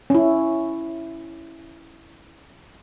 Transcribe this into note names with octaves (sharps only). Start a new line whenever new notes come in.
C#4 E4